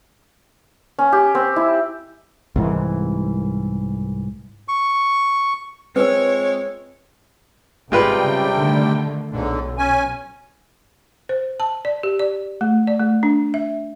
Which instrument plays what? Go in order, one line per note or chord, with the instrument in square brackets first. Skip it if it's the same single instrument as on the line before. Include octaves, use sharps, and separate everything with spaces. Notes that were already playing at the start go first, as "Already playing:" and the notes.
[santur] C#4
G4
C4
E4
[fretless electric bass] C2 G#2 E3
[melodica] C#6
[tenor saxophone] G#3 [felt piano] C4 F4 E6 [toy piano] B4 [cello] C#5
[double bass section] G#1 [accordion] C3 G3 G5 [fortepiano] G#3 F4 B4
[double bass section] C#3
D3 D#3 A3
[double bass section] B1 [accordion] G#2 D3
[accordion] C#4 G#5
[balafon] C5
A5
D5
G4
D5
A3
D5
A3
D4
E5